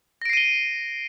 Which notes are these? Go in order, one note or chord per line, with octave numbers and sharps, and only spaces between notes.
A#6 C7 D7 D#7 G7